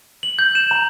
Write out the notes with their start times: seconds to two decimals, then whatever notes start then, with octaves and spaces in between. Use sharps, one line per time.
0.23 F#7
0.39 G6
0.55 E7
0.71 A#5